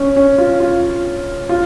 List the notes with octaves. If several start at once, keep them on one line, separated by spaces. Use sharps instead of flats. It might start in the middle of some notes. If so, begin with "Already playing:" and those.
Already playing: C#4
C#4
F4
F4
F4